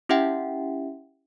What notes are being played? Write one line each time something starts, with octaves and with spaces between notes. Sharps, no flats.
C#4 E4 G4 E5 F#5 G5